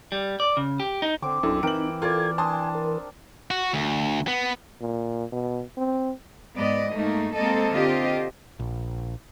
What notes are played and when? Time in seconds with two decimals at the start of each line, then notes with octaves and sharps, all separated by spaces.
0.12 G3
0.40 D5
0.57 C#3
0.80 G4
1.02 D#4
1.22 D3 C4 D6
1.43 B1 F#2 D4 E4 A4 E5
1.63 E3 C4 D#4 A#4 G5 D7 F#7
2.02 F4 A4 A#4 D5 G#6
2.38 D4 G#5 A5 C6 D#6
2.75 A#4
3.51 F#4
3.74 D2
4.28 B3
4.81 A#2
5.32 B2
5.78 C4
6.56 G#2 B3 D5 D#5
6.92 G#2 A3 A#3 D#4
7.36 G#3 A#3 C4 A4 D#5
7.73 D3 C4 F4 G4 C5 D#5
8.59 A#1